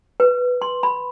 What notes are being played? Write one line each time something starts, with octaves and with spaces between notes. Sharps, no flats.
B4
C6
B5